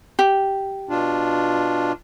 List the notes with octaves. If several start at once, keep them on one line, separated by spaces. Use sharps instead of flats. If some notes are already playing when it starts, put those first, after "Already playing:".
G4
B2 D4 F4